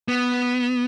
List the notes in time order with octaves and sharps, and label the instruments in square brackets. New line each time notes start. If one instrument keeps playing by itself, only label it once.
[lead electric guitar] B3